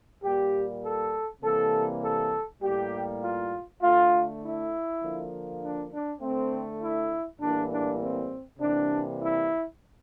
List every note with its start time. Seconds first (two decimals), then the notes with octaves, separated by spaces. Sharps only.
0.22 A#2 G3 A#3 G4
0.82 A4
1.41 C3 E3 G3 A#3 A4
2.01 A4
2.61 A2 G3 A#3 G4
3.21 F4
3.81 D3 A3 F4
4.40 E4
5.01 D3 F3 A#3
5.60 D4
5.90 D4
6.20 D3 A3 C4
6.80 E4
7.40 A2 E3 G3 A#3 D4
7.69 D4
7.99 C4
8.59 C3 E3 G3 A#3 D4
9.19 E4